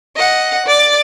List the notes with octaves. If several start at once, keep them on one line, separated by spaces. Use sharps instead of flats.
D#5 F#5
D5 A6